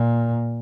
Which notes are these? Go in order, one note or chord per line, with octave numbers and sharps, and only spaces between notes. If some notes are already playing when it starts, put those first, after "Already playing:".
Already playing: A#2